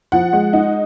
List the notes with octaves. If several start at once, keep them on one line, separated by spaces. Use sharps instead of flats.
F3 F#5
G#3
D#4